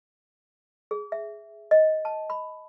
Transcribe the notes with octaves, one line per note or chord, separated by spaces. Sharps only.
G#4
E5
D#5
A5
B5